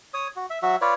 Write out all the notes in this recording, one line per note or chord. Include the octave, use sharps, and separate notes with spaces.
C#5 D#6
F#4
E5
F#3 F#4 E5
F4 B4 C#5 D5